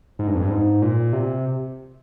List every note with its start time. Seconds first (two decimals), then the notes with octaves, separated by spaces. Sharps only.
0.19 G#2
0.27 G2
0.35 F2
0.43 G2
0.50 G#2
0.82 A#2
1.13 C3